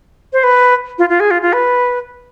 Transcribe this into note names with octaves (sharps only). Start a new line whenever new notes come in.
C5
B4
F4
F4
G#4
F4
F4
B4